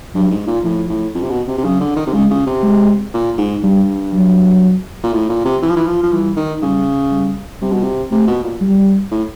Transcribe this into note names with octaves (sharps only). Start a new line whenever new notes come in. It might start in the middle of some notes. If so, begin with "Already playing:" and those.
G2 F#3
G#2
A#2
A2 F3
A2
F2
C3
B2
C3
C3
C#3 F#3
D3
D#3
C3
C#3 G#3
C#3
C3
G#3
A#2
G#2
G2 G3
F#3
A#2
A2
A#2
C3
E3
F3
E3
F3
F3
E3 G3
D#3
C#3 G3
G3
C3 G3
B2
C3
C3 A3
B2
A#2
G3
A2